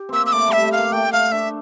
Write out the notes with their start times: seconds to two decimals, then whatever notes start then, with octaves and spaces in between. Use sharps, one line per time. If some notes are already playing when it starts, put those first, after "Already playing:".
Already playing: G4
0.09 A#3 C4 E6
0.26 E6
0.33 A3 D6
0.48 G3 E5
0.62 A3
0.72 F5
0.78 A#3
0.92 A3 G5
1.12 A3 F5
1.32 D4 E5